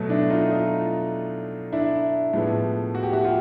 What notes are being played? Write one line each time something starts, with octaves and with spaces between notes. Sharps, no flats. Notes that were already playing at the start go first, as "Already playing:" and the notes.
Already playing: B2 F#3 A3
D4 E4
D#4 F4
D#4 F4
D4 E4
A2 F3 G#3 B3
F#4
G4
E4 F#4
F4 G4